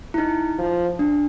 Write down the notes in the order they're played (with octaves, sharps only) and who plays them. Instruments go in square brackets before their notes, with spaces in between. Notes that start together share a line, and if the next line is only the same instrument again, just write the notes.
[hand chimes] E4
D#4
[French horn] F3
[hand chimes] D4